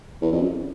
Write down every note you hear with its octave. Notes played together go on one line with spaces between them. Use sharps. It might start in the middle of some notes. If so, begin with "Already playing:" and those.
E2
F2
F#2